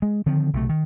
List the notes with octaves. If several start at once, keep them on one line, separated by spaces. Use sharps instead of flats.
G#3
D3 D#3 F3 C4
B1 C3 A3
D#3